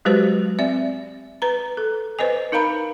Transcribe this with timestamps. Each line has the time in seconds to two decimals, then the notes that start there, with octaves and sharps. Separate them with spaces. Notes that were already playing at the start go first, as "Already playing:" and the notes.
0.05 F#3 G#3 F#4 G4 B4 C5
0.59 C4 D5 E5
1.42 B4 A#5
1.77 A4
2.19 B4 C5 D#5 G#5
2.52 D#4 A#4 F5 A#5 B5